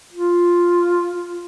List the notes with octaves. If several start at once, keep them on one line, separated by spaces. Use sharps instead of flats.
F4